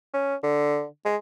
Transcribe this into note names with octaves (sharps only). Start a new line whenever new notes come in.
C#4
D3
G#3